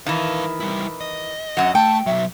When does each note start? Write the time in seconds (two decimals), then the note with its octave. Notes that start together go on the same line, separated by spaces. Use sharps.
0.07 D#3 E3 B4 F5
0.60 G3 E4
1.01 D#5
1.57 F#2 F#3 F#5
1.75 A3 G5 A5
2.06 B1 F#3 E5